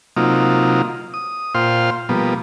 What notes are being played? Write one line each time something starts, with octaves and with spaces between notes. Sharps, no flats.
C3 F#3 A#3 D#4 F4
D#6
A#2 F4 C5 F5 G5 C6
B2 F3 G3 A#3 B3